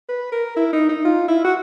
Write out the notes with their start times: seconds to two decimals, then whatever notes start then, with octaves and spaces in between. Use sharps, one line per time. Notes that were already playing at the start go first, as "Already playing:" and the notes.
0.09 B4
0.32 A#4
0.56 E4
0.73 D#4
0.89 D#4
1.05 F4
1.28 E4
1.45 F#4